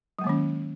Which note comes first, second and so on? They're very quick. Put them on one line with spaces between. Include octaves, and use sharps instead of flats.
F#3 G#3 A#3 D#3 C#4